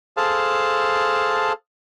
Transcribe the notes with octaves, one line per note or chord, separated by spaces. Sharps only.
G#4 A4 C5 F5 A5